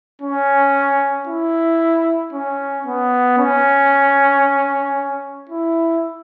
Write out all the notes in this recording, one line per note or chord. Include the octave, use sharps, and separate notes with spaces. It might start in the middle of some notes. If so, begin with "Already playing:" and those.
C#4
E4
C#4
B3
C#4
E4